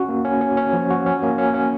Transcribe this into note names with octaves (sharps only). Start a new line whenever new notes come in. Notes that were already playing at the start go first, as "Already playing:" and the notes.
Already playing: C#4 F#4
A#3
C#4
C#4
C#4
F3
F#4
C#4
A#3
C#4
C#4